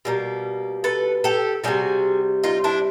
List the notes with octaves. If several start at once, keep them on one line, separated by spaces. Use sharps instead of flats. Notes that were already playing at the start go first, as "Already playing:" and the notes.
B2 G3 A#3
A4 B4
G4 A4
C3 E3 G3 F#4 G#4
D#4 F4
D4 E4